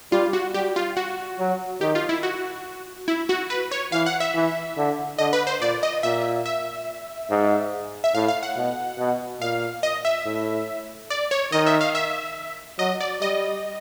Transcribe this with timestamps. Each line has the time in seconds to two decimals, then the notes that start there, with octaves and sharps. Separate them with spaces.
0.12 G3 F4
0.33 F#4
0.54 G3 G4
0.76 F4
0.97 F#4
1.39 F#3
1.81 D#3 G4
1.95 F4
2.09 E4
2.23 F#4
3.08 E4
3.29 F#4
3.50 B4
3.71 C#5
3.92 E3 F5
4.06 F#5
4.20 E5
4.34 E3
4.77 D3
5.19 D3 D#5
5.33 B4
5.47 C5
5.61 A#2 D5
5.83 D#5
6.03 A#2 E5
6.46 E5
7.30 G#2
8.04 E5
8.14 A2 F5
8.28 F5
8.43 F#5
8.56 B2
8.99 B2
9.41 A#2 F5
9.83 D#5
10.05 E5
10.25 A2
11.10 D5
11.31 C#5
11.52 D#3 D#5
11.66 E5
11.81 F5
11.95 E5
12.79 F#3 D#5
13.00 D5
13.21 G3 D#5